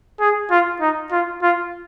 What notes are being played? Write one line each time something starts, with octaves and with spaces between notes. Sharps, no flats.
G#4
F4
D#4
F4
F4